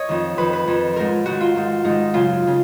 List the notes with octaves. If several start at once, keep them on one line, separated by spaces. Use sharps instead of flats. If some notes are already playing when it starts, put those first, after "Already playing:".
Already playing: C#5 D#5
F2 D#3
F2 D#3 B4
B4
F2 D#3
G#2 D#3 A#4
G#2 D#3 F#4
F4
G#2 D#3
G#2 D#3 D#4
F#2 C#3 F4
C#3